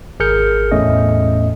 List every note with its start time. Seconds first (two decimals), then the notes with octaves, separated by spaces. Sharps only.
0.20 G#1 G#4 A#4 F6 G6 C#7
0.72 E2 A2 A3 C#4 D#5